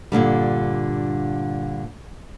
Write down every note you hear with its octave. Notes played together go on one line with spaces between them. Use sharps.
G2 A#2 D3 G3